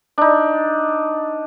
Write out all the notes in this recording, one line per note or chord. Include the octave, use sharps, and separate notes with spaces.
D4 D#4